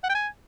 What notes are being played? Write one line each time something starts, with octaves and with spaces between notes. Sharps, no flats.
F#5
G5
G#5